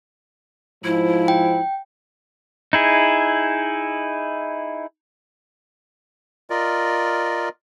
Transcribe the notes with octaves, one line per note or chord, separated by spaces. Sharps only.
G#2 F3 E4
G5
D#4 E4 G#4
F4 A#4 D5 D#5